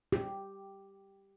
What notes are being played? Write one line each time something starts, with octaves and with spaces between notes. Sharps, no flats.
G4